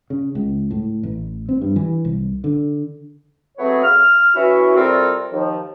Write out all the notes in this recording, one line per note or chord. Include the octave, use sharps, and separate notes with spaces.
C#3
C#2
A2
A1
C4
G2
E3
C2
D3
F#3 A3 B3 C4 G#4 C#5
F6
E3 C#4 E4 F#4
C3 G3 C4 F4 A4 A#4
D#2 F3